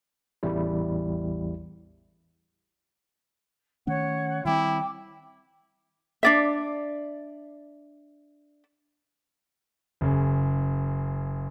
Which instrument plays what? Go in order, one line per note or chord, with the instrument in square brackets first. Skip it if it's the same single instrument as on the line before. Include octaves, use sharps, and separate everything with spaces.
[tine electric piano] A1 E2 G3 E4
[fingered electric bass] D#3 A3 C#4 [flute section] C#5 F#5
[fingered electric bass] D#3 G3 C4 [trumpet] E4 [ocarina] G5 [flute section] D6
[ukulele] D4 D5 E5
[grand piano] F#1 C#3